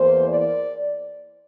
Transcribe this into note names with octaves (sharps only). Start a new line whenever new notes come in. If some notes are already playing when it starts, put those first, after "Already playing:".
Already playing: E2 E3 A#3 C5
D5